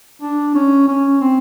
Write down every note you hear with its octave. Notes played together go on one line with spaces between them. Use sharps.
D4
C#4
C#4
C4